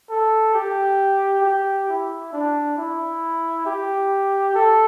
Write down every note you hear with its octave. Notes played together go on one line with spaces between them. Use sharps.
A4
G4
G4
E4
D4
E4
G4
A4